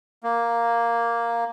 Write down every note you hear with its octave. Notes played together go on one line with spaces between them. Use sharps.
A#3